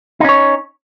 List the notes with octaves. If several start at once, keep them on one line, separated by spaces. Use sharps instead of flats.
C#4 D#4 C#5